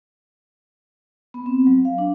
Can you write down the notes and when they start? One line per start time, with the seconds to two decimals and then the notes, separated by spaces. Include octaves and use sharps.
1.34 B3
1.46 C4
1.67 F#3
1.85 F5
1.98 D4